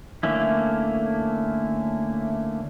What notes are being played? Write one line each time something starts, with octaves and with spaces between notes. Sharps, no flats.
D3 A3 A#3 C#4 E4